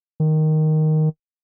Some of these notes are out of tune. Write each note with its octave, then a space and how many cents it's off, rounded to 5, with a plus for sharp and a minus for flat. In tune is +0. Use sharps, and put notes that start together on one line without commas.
D#3 +0